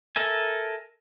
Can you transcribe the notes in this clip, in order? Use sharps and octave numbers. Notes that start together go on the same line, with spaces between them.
A4 A#4 E5 G#5